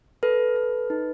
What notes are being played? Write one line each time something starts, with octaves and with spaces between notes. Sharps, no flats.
A4 B4
A4
D#4